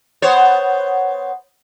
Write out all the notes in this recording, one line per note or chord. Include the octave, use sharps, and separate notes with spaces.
B3 C5 C#5